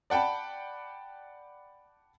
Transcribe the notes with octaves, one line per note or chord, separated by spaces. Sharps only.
D5 F#5 G5 A5 B5